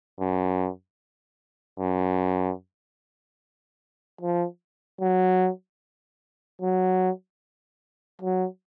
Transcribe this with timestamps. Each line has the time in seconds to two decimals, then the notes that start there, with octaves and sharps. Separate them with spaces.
0.20 F#2
1.80 F#2
4.21 F3
5.01 F#3
6.61 F#3
8.21 F#3